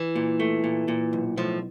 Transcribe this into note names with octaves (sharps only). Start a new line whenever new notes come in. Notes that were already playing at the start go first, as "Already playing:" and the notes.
Already playing: E3
A#2
A3
A#2
A#2
B1
A2 F3